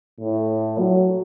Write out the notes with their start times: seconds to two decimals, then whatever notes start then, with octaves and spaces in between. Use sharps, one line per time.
0.20 A2
0.79 F#3